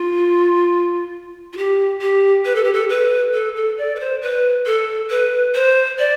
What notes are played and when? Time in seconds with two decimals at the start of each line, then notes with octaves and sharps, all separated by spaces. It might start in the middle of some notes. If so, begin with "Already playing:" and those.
Already playing: F4
1.53 F4
1.57 G4
2.02 G4
2.46 B4
2.55 A4
2.64 G4
2.73 A4
2.89 B4
3.34 A4
3.56 A4
3.78 D5
3.96 B4
4.00 C5
4.22 B4
4.66 A4
5.10 B4
5.55 C5
5.99 D5